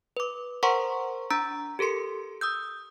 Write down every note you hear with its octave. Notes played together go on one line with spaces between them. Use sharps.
B4 D6
A#4 C5 F#5 A#5 C6 C#6
D4 A#5 E6 A6 D7
G4 A4 A#4 C6 C#7
D#6 E6 G6